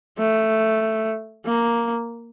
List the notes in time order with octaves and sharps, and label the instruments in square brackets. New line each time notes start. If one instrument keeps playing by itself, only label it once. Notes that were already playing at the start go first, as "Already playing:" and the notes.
[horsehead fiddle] A3
A#3